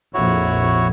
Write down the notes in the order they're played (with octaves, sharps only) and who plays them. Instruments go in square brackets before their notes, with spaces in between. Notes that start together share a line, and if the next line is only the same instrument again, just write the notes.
[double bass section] A#1 F2 [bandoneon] E4 F#4 C#5